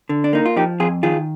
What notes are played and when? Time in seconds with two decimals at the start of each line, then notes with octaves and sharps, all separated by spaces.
0.09 D3
0.24 D4
0.33 A#3 D#4
0.46 F4
0.56 F3 D#4 G4
0.80 F2 F4 G#4
1.03 D#3 F4 G#4